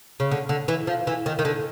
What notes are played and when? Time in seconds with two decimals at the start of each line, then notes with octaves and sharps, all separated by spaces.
0.20 C#3
0.31 D3
0.49 D3
0.68 E3
0.87 F3
1.07 E3
1.26 D#3
1.39 D#3
1.45 D3